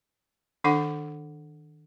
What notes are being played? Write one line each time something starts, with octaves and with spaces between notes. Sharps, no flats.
D#3 D4 A4 F#5 D6